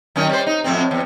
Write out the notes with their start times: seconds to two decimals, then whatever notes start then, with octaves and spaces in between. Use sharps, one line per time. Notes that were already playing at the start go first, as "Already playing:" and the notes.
0.16 F#2 D#3 C#4
0.29 G3 C5
0.47 D#4
0.64 F2 A2 C4
0.91 E2